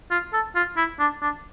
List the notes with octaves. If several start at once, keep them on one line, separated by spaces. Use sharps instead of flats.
F4
A4
F4
E4
D4
D4